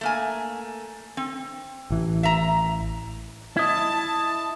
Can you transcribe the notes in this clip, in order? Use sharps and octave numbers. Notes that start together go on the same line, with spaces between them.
A3 A#3 G#5
C4
A1 E3
E5 A#5
E4 D#5 A5